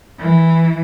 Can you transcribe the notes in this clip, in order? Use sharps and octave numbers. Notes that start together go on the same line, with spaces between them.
E3